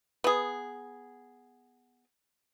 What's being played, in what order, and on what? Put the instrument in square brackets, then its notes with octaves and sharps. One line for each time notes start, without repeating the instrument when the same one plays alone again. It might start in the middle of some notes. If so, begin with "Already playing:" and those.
[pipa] B3 G#4